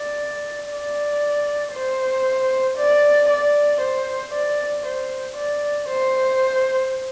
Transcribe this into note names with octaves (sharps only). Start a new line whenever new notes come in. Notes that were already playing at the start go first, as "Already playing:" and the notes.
Already playing: D5
D5
C5
D5
D5
C5
D5
C5
D5
C5